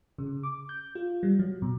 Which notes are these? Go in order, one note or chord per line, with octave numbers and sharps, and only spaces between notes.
C#3
D6
G6
F4
G3
F#3
B2